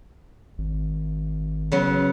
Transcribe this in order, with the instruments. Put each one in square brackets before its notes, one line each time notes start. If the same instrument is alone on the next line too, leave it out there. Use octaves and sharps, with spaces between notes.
[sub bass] G#1
[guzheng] C#3 F#3 B3